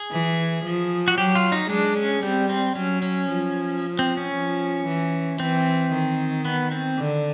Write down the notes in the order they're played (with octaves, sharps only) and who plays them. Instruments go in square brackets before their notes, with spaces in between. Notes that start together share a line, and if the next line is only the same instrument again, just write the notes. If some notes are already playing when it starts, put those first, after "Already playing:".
Already playing: [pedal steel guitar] G#4
[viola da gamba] E3
F3
[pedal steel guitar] F#4
[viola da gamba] F#3 [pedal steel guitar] G4
[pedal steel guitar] F4
D#4
[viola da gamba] G#3 [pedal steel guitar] D4
[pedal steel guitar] C#4
[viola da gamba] G3 [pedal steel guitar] C4
[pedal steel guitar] C4
[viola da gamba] F#3 [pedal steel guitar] C#4
[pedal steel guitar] C#4
[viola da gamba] F3
[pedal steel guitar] C4
C#4
[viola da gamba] F3
E3
[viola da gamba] E3 [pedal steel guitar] C4
[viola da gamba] D#3
[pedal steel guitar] B3
C4
[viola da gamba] D3